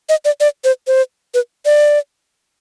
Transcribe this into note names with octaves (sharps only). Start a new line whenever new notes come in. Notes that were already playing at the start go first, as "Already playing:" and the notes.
D#5
D5
D5
C5
C5
B4
D5